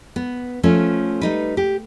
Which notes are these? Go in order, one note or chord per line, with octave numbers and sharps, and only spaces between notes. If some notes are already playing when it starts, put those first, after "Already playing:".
B3
F3 A3 C#4
G3 D#4 B4
G4